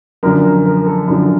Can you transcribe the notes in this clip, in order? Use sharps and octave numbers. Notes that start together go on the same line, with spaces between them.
F#2 D3 F3 A#4
A#4
A#4
A4
F#2 D3 F3